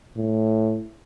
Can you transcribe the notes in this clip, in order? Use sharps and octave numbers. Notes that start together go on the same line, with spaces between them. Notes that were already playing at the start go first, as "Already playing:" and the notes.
A2